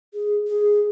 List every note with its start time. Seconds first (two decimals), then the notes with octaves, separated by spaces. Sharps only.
0.14 G#4
0.48 G#4